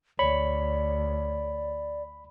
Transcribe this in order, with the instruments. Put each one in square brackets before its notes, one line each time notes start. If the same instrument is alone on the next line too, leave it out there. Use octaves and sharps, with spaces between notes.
[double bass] D2 [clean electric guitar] C#5 [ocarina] D5 [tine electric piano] B5